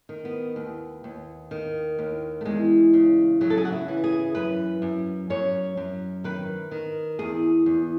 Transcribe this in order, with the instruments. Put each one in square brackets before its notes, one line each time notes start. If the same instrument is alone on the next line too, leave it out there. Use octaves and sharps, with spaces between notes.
[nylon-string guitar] D#3
B3
D#2
D#2
D#3
D#2
A3
E2 G#3
C#3
C#3 F#3
A4
G#4
F#4
E4
E3
G#4
F#2 B4
F#2
F#2 C#5
F#2
D#3 B4
D#3
E2 G#4
E2